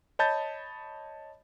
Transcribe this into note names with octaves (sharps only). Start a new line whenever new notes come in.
C#5 D#5 A5 B5 G6 A6